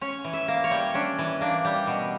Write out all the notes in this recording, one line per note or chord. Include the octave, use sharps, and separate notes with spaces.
C#4 C#5
E3
E5
A#3
C#5
G3
C#4 D4
E3
A#3 D4
G3
B2